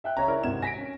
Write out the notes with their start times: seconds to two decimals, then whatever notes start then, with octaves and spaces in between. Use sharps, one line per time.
0.04 E5 G5 F#6
0.17 C#3 C#5 E5 A#5
0.28 E4 A#4 D5
0.43 G#1 C3 G#6 E7
0.62 G#5 A#6 B6 D7
0.78 C#4